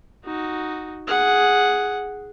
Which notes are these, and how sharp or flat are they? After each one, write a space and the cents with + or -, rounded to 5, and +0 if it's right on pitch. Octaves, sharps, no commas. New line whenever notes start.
D#4 +0 F#4 +0
G#4 +0 F#5 +0